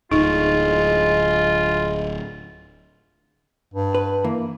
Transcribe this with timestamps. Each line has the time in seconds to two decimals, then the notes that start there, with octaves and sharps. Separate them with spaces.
0.12 D1 G#3 D#4 F4
3.74 G2
3.95 B4
4.24 E3 A#3